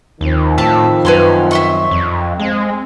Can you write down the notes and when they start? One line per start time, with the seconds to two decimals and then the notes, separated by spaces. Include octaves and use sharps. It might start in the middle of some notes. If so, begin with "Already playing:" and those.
0.21 D#2 D#3 F3 C4
0.58 A2 E5 F5 A5
1.05 F#2 B4 C#5 C6
1.51 E5 C6 C#6
1.91 F2
2.39 G#3 C4